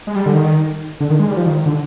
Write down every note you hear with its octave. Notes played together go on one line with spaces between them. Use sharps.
G#3
G3
D3
D#3
D3
D#3
G#3
G3
F3
D#3
D3